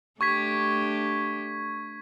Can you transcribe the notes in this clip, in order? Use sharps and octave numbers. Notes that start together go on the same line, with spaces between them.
A3 D4 G4 C#6 G#6 B6